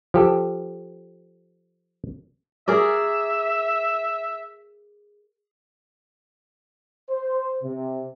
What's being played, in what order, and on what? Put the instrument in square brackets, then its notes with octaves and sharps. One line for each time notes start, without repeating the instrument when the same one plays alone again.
[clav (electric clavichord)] F3 G4 A4
[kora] G#4 A#4 D5 [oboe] E5
[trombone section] C5
C3